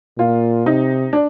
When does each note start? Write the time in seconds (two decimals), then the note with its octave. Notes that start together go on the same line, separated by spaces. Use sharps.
0.18 A#2 F4
0.66 C3 D#4
1.13 D4